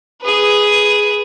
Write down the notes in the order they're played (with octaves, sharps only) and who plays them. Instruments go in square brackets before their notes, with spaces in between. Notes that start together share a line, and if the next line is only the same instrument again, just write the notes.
[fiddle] G#4 B4